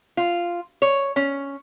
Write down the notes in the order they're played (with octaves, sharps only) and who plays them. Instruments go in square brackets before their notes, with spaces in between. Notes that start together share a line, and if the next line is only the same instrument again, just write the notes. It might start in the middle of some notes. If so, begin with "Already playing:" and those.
[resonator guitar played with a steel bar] F4
C#5
C#4